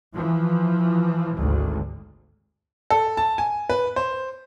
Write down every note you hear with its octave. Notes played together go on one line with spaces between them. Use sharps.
E3 F3
G#1 D2
A4
A5
G#5
B4
C5